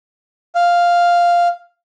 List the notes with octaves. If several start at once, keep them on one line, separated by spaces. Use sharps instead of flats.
F5